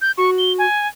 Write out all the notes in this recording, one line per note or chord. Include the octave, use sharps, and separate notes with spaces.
G6
F#4 C#6
G7
G#5